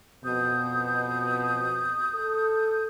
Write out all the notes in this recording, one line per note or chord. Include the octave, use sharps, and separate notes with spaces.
F2 B2 D#6 G6
A4